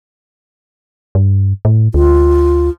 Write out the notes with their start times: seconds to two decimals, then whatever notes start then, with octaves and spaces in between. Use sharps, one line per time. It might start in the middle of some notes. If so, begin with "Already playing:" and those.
1.15 G2
1.65 A2
1.94 D2 F4